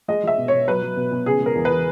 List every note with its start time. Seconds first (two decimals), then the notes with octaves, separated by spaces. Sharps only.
0.08 G#3 D#5
0.24 G#3 E5
0.38 B2
0.48 B2 C#5
0.68 F#3 B4
0.82 F#3
0.97 B2
1.12 B2
1.26 C#3 G#4
1.41 G#3
1.46 A#4
1.55 E2
1.65 B4
1.71 E3